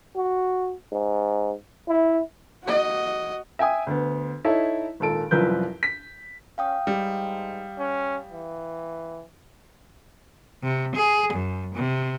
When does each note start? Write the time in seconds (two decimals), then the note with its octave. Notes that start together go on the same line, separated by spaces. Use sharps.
0.16 F#4
0.92 G#2
1.89 E4
2.64 F#4 D#5
3.59 E5 G5 G#5 D#6
3.87 D2 B3
4.44 D#4 E4 A4 C#5 E5
5.00 G#1 A#2 A4 D7
5.31 C2 F#2 F3 B4 G6
5.83 B6
6.58 C#4 F5 G5 D#6
6.87 G#2 G3
7.79 C#4
8.32 E3
10.63 C3
10.96 G#4
11.33 F#2
11.75 C3